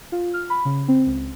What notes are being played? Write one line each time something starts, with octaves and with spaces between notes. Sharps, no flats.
F4
F6
B5
C#3
C4
C#2